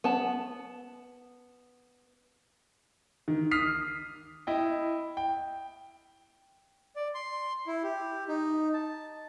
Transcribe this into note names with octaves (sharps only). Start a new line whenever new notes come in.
B3 A5
D#3
D#6 F6 B6 C7
E4 D#5 G5
G5
D5
C6
E4
G4
D#4
A5